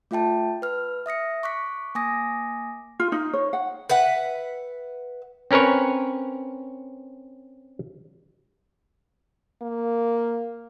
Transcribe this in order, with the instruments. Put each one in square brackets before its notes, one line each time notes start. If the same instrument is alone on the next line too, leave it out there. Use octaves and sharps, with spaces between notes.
[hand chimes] A3 F4 E5 G5 A5
B4 F6
E5 D#6 A#6 C#7
C#6 D6 F#6 B6
A#3 G#5 D6 D#6 A#6
[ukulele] F4
D#4
C#5
F#5
[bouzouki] B4 E5 F#5
[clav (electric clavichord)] C4 C#4 A#4 B4 C#5
[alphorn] A#3